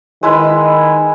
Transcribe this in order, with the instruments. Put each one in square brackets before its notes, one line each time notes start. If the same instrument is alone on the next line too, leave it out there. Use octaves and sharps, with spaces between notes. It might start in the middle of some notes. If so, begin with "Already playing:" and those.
[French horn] D#3 [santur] G#3 E4 B4